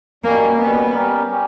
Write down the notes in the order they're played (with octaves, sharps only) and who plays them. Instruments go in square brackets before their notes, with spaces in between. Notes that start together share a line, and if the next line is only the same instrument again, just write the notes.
[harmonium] B2 G3 C#4 [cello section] A#3
[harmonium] B2 G3 C#4 [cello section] B3
[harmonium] G3 C#4 G4 A#4 D5
G3 C#4 G4